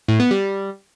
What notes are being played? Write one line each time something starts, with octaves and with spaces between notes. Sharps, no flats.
A2
B3
G3